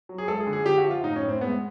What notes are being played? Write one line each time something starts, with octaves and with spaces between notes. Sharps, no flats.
F#3
G#4
G#3 A4
G#4
D3
G#4
D3 G4
F#4
F3
F4
A2 D#4
C#4
A2
C4
G#3 B3